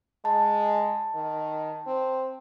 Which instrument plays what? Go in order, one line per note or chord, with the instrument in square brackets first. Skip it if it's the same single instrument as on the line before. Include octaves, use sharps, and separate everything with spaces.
[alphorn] G#3 [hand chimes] A5
[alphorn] D#3
C4